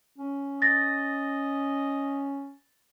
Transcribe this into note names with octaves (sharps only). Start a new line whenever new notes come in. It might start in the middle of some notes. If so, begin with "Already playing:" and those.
C#4
D#5 A6 A#6